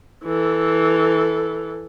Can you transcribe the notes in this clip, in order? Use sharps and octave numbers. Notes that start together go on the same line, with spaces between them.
E3 A4